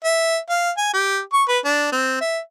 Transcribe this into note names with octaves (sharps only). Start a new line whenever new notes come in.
E5
F5
G#5
G4
C#6
B4
D4
C4
E5